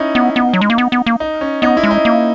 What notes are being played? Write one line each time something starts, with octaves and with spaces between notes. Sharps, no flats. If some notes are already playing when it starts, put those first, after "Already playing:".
Already playing: C#4 D#4 E4
B3
B3
F#3
G#3
A#3
B3
B3
A#3
D#4
C#4
B3 D#4
E4
G#3
D#4
A#3